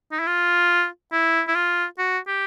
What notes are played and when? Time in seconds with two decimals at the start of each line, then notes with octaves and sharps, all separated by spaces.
0.12 D#4
0.20 E4
0.27 F4
1.12 E4
1.48 E4
1.55 F4
1.98 F#4
2.27 G4